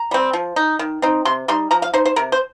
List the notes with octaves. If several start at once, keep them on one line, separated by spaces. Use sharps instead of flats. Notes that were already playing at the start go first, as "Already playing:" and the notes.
Already playing: A#5
G3 C4
F3
D#4
D#3
C4 D#4
C3 C6
G3 D#4 C6
F3 A#5
F5
D#4 C5
C5
C3 A#4
C5